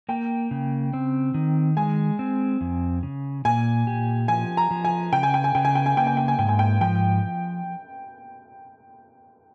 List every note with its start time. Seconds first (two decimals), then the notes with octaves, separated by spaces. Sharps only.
0.09 A#3 G5
0.51 C#3
0.93 C4
1.34 D#3
1.77 G#3 G#5
2.19 C4
2.61 F2
3.03 C#3
3.45 A#2 G#5
3.87 G4
4.28 F3 G#5
4.57 A#5
4.71 F3
4.85 G#5
5.13 C#3 G5
5.23 G#5
5.34 G5
5.44 G#5
5.55 C#3 G5
5.65 G#5
5.75 G5
5.86 G#5
5.97 A#3 G5
6.07 G#5
6.17 G5
6.28 G#5
6.38 G#2 G5
6.49 G#5
6.59 G5
6.81 F3 G5